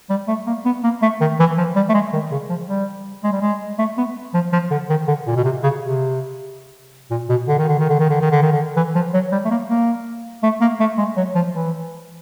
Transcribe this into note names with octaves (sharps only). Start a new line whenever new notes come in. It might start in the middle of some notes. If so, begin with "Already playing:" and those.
G3
A3
A#3
B3
A#3
A3
D#3
E3
F3
G3
A3
G#3
D#3
C#3
F3
G3
G#3
G3
G#3
A3
B3
F3
F3
D3
D#3
D3
A#2
B2
C3
C#3
C3
A#2
B2
D3
D#3
D3
D#3
D3
D#3
D3
D#3
D3
D#3
D3
E3
F3
F#3
G3
A3
A#3
A#3
A3
A#3
A3
G#3
F#3
F3
E3